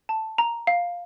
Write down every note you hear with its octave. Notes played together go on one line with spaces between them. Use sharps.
A5
A#5
F5